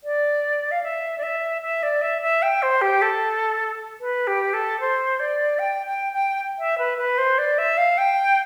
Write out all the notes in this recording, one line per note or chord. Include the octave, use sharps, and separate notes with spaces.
D5
F5
E5
D5
E5
E5
D5
E5
E5
G5
C5
G4
A4
B4
G4
A4
C5
D5
G5
G5
G5
E5
B4
B4
C5
D5
E5
F5
G5